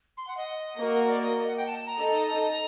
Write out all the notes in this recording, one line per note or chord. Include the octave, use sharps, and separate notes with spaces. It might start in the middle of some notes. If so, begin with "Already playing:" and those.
C6
F#5
D#5
A#3 F#4 A#4
D5
D#5
D#5
F#5
G5
A5
A#5
D#4 A4 D#5
A#5